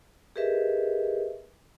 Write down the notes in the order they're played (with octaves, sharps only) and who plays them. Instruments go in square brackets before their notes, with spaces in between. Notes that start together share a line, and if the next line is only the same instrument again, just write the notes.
[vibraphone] G4 G#4 A#4 B4 D#5 E5